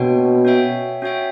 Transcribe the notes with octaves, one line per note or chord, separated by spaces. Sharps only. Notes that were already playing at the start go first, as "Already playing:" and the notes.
Already playing: B2 A#3 D4 F#4 C#5 G5
C#4 F#4 C#5 E5 G5
C#4 F#4 C#5 E5 G5